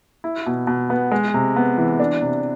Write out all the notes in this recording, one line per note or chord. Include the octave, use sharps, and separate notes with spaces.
E4
B2
B2
B3
G#3
C3
B3
E3
D4
C3